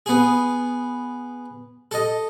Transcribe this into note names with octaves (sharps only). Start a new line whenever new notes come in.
B3 G#4
A4 D#5